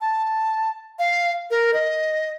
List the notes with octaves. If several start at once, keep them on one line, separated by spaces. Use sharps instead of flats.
A5
F5
A#4
D#5